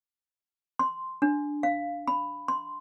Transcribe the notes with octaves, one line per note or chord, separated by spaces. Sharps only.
C6
D4
F5
B5
C6